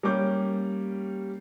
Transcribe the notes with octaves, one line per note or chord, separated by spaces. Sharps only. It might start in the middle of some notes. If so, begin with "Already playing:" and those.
G3 A#3 C#4 D6 G6